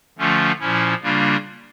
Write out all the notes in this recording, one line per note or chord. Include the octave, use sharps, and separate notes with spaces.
D3 F3 A3 C#4 F4
A#2 F3 C#4 E4
C#3 G3 A#3 D4 F4